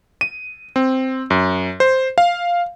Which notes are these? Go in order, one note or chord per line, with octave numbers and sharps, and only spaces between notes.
D#7
C4
F#2
C5
F5